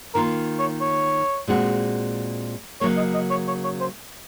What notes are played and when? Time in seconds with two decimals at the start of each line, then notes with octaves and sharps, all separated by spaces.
0.15 D#3 A#3 F4 A#4
0.59 C#5
0.81 C#5
1.47 A#2 G#3 C4 F#4
2.81 C#3 F#3 A#3 C#5
2.97 D#5
3.14 D#5
3.30 C#5
3.48 C#5
3.64 C#5
3.81 C5